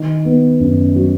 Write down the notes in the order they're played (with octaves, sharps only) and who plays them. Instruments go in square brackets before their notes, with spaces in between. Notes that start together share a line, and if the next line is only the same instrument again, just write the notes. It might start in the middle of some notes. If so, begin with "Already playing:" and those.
Already playing: [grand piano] D#3
B3
F#2
F#3